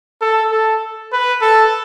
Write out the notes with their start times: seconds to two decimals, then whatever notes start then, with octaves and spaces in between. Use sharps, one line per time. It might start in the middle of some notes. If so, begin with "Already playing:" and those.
0.21 A4
0.51 A4
1.12 B4
1.42 A4